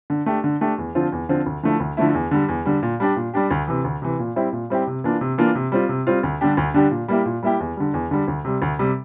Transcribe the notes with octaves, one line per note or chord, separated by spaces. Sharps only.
D3
A3 D4 G4
D3
A3 D4 G4
E2
D3 F3 C4 F4
E2
D3 F3 C4 F4
D2
D3 F3 A3 E4
D2
D3 F3 A3 E4
E2
D3 G3
E2
D3 G3
A#2
G3 D4 G4
A#2
G3 D4 G4
D2
C3 E3
D2
C3 E3
A#2
G3 C4 E4 G4
A#2
G3 C4 E4 G4
C3
E3 A#3 D4 F4
C3
E3 A#3 D4 F4
C3
G3 C4 F4
C3
G3 C4 F4
D2
D3 G3 D4 G4
D2
D3 G3 D4 G4
A#2
G3 A#3 E4 G4
A#2
G3 A#3 E4 G4
E2
D3 G3
E2
D3 G3
D2
C3 G3
D2
C3 G3